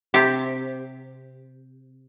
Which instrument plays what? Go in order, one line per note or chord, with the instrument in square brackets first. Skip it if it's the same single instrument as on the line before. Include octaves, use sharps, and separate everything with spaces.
[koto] C3 C4 G4